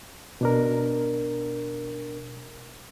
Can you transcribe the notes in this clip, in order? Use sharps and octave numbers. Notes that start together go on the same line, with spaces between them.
B2 D4 A#4